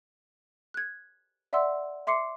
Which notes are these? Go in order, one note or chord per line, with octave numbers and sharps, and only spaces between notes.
F#6 G#6
D5 E5 F#5 C6 E6
E5 C6 D6 C7 C#7